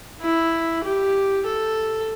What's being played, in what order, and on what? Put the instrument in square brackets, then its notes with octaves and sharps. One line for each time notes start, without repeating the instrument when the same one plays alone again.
[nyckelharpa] E4
G4
A4